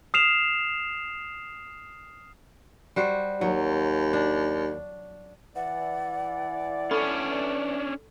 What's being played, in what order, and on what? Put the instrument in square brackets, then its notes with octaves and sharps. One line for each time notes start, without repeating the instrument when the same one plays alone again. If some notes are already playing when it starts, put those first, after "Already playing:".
[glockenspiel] D#6 F6 C7 E7 F7
[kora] G3 F#4 C5
[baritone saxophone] D#2 [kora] F#3
[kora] D4
[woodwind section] E3 D5 [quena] F#5
[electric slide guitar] C#4 D4 [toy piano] A4 B5 C#6